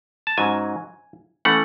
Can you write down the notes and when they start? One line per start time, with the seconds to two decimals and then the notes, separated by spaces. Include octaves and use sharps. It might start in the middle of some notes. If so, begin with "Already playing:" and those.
0.27 A5
0.38 G#2 F#3 C#4 G#5
1.45 E3 A3 C#4 F#5